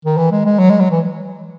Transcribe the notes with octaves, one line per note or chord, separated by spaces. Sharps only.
D#3
E3
G#3
G#3
F#3
G#3
F#3
E3